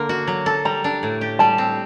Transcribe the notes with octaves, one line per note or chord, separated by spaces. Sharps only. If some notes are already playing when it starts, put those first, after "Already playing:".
Already playing: D3 A#3
F#4
F#3
A4
G3 A#5
D4
A2
G4
G3 A5
C4